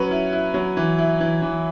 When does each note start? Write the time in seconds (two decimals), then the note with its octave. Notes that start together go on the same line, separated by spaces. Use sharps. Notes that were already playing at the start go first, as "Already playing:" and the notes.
Already playing: F#3 C#4 B4
0.11 E4
0.32 E4
0.54 F#3
0.77 E3
0.98 E4
1.20 E3
1.42 E3